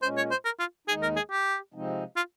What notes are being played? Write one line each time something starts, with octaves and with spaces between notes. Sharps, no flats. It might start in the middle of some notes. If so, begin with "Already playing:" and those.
A#2 G#3 C#4 C5
C#5
C5
A#4
F4
D#2 D#3 G#3 D#4 G#4
A#4
G#4
G4
C3 F3 G#3 C4 D#4
F4